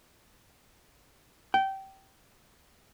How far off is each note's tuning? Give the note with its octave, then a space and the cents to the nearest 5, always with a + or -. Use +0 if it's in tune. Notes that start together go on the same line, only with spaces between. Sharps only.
G5 -20